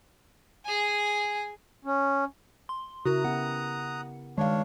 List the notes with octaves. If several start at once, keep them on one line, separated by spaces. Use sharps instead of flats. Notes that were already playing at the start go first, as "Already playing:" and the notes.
G#4 G#5
C#4
C6
C#3 E4 F#4 A#4 A#5 D#6 F#6
B3 G4 F#5
G2 D#3 G#3 D4 C#5 F5